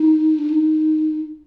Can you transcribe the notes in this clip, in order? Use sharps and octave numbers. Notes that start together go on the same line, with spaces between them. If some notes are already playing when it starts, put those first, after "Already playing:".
Already playing: D#4
D4
D#4